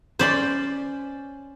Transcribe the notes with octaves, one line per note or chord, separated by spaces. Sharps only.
C#4 C5 D5 B5 C6